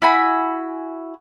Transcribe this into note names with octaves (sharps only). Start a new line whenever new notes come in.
E4 F#4 G#5 B5